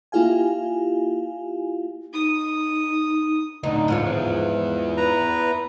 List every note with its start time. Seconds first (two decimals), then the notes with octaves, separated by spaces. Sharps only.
0.12 A#3 E4 F4 G4 F5 G#5
2.13 D#4 D#6
3.63 A2 D3 D#4
3.88 G#2 F3 C#5
4.06 B3 E4
4.97 B4 A#5